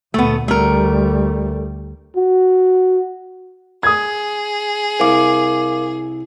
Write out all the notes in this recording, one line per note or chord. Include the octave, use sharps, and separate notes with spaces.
D2 A#2 A3 B3
D2 G3 A3 A#4
F#4
G#4 D#6 G#6
C2 A#4 F5 D6